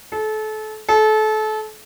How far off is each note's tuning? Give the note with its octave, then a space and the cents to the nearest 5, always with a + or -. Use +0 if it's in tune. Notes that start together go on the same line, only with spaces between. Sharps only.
A4 -30
A4 -30